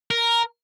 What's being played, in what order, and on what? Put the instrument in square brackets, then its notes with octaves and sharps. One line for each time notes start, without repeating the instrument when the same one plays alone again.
[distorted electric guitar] A#4